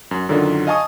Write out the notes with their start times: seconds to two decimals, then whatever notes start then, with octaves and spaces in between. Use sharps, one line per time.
0.11 F#2
0.29 F#2 D3 D#3 F#3 F4
0.67 D#5 F5 G#5 A5 C#6 D#6